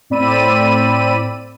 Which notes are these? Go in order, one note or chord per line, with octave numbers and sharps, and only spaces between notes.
A2 C4 D5 B5 E6 D#7